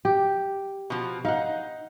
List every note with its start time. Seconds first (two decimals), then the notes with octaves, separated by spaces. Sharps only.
0.05 G4
0.90 B2 F3
1.25 D#4 F5 F#5